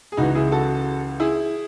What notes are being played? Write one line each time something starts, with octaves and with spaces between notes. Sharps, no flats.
G#4
C#2 C#3 E3 D#4 F#4
E4 G#4
F#4 A4
E4 G#4